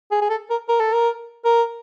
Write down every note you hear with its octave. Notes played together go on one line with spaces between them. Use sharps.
G#4
G#4
A4
A#4
A#4
A4
A#4
A#4